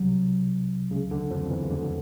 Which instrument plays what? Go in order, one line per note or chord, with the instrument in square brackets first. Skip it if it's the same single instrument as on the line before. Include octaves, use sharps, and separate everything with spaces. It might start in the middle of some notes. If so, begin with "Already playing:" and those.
Already playing: [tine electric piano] C2 C3 [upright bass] F#3
[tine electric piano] C#2 C#3
D2 D3
F2 F3
E2 E3
D2 D3